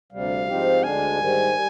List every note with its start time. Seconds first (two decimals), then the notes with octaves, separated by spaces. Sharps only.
0.12 D2 C3 G3 F5
0.48 G#2 F3 C4 D#4 G4
0.83 D2 D3 G#3 D4 G#5
1.18 G#2 D#3 G3
1.54 G3